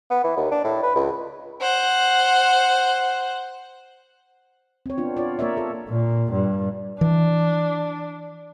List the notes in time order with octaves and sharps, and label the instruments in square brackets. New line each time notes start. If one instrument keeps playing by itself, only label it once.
[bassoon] B3
E3
D#2
D4
A2
B4
C#2
[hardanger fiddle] C5 F#5
[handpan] C4 C#5
B3 D4 F4
F4 C#5 D5
A#3 A#4 C#5 D5 E5
F4 A4
[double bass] A#2
G2
[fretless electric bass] E3 [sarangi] D4